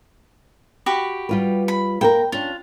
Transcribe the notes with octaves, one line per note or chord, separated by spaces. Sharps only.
F#4 G4 B5
G3 F4 B4
B5
A#3 A4 A#4 G5
C#4 D4 F4